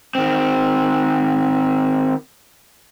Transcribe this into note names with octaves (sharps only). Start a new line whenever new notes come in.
D#3 C4